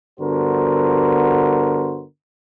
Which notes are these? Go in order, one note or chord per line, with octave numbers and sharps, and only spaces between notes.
G2 D3 B3 F#4 A#4 C5